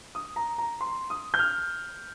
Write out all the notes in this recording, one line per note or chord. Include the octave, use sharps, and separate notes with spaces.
D#6
A#5
A#5
C6
D#6
G6
F6